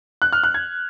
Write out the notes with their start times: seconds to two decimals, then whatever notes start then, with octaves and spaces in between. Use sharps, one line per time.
0.22 F#6
0.33 F6
0.43 F#6
0.54 G#6